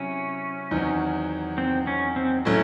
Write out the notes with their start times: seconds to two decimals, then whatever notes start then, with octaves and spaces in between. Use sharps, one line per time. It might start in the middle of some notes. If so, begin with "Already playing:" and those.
Already playing: C3 F#3 C#4 E4
0.71 E2 D#3 F#3 C4 D#4
1.58 C4
1.87 C#4
2.16 C4
2.45 A2 F#3 A3 C#4